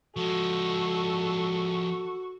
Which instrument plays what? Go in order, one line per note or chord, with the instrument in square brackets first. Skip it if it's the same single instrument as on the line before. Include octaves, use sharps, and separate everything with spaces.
[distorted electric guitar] F3 G#3 [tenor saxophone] F#4 [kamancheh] A4